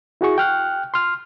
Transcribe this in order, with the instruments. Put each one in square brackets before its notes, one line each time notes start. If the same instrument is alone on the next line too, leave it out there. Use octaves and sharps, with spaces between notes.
[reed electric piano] E4 F#4 G#4 C#6
G5 F6 F#6
C6 F6